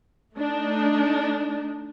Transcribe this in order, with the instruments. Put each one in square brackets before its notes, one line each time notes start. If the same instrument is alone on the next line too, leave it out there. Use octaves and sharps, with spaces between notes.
[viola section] A3 D4 D#4